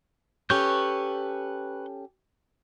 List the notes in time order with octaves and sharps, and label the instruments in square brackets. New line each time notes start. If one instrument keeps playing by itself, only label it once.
[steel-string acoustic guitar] C#4 G4 A4 [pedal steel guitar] B4 C#6 G6